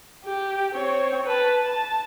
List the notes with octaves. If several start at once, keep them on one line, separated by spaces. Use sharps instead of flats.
G4
C4 C#5
B4 A5
A5